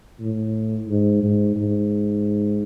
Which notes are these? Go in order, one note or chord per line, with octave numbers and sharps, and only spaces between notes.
A2
G#2
G#2
G#2